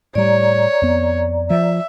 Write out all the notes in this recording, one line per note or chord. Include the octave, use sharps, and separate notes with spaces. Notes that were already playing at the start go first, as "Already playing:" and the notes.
A2 G3 C#5 D5 A#5
F2 B3
F3 E5